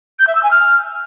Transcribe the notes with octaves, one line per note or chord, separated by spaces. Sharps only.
G6
E5
E6
G#5
F6